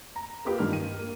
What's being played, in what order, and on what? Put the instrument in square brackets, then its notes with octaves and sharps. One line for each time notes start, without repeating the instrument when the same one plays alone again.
[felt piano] A#5
A#3 F4 G4 B4
G2 D#3 D4 F6
D#7
A#3